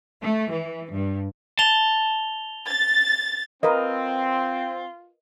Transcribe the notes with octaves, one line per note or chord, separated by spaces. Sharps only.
A3
E3
G2
A5 F7 G7
A6
C4 F4 A#4 B4 D#5